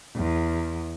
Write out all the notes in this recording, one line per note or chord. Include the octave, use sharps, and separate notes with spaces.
E2